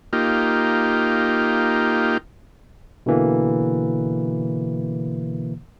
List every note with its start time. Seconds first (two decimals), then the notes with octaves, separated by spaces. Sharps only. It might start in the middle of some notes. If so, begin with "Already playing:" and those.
0.13 A#3 D#4 F4 G4
3.06 B2 D3 E3 A#3